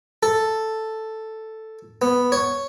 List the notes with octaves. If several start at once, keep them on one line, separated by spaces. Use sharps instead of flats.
A4
B3
C#5